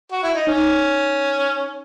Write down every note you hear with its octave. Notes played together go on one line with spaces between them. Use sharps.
F#4
E4
D#4
C#4 D#4